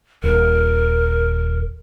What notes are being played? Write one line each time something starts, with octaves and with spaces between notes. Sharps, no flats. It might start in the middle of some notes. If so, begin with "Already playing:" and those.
D#1 A#4